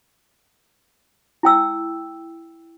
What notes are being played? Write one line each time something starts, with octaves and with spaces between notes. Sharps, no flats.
E4 G5 E6